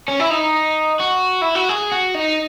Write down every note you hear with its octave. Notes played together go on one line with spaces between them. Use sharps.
C#4
E4
D#4
F#4
E4
F#4
G#4
F#4
D#4